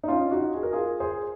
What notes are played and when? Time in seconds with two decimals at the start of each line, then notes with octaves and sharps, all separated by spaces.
0.03 D#4
0.08 C#4 F4
0.31 D#4 F#4
0.54 G#4
0.63 A#4
0.73 F4 G#4
1.00 G#4 C5